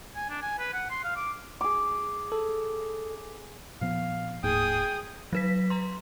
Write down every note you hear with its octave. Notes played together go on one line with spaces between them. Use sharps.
G#5
D4
G#5
B4
F#5
C6
F5
D6
G#4 D6
A4
A#2 F3 B3 F5
D1 G#2 A#3 G#4 G5 D#6
F#3 B4 B6
A#5 C6